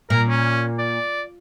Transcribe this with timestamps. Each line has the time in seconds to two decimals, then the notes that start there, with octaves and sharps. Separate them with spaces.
0.10 A#2 A#4
0.29 C#4
0.79 D5